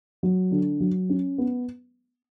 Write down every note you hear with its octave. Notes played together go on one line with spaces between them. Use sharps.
F#3
D3
F#3
C#4
B3